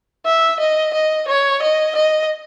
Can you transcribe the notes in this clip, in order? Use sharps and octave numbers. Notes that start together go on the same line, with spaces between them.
E5
D#5
D#5
C#5
D#5
D#5